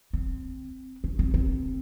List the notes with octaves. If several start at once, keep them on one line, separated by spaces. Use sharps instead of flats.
C4
C#4
C4
C4